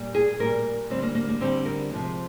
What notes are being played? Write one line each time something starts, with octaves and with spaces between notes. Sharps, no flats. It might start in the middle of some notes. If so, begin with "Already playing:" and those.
Already playing: A#2 G3
G#4
A#2 G3 A#4
D3 G3 C4
A#3
A#3
A#3
D3 G3 C4
A#4
C3 F3 G#3